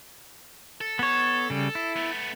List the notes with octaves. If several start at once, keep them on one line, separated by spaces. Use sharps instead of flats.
A4
B3 C#5
C#3 G3
E4
A3 B3